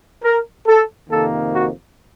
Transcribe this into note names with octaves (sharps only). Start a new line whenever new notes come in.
A#4
A4
F2 C3 D#3 A#3 A4
F#4